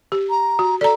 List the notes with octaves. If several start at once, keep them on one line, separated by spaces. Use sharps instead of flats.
G4
A#5
F#4
A4 D5 A#5